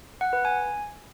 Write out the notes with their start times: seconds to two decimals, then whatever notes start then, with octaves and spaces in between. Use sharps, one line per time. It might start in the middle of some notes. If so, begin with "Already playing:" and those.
0.21 F#5
0.33 B4
0.45 G#5